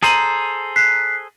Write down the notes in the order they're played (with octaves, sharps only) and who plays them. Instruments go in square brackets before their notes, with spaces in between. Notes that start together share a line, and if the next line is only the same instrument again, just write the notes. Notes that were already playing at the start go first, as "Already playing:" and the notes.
[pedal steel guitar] G#4 A4 C5 [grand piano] A#5 D#7 F#7
[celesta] F#6 B6 C7